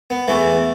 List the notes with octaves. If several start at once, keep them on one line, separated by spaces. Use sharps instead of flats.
B3
E2 E3 A3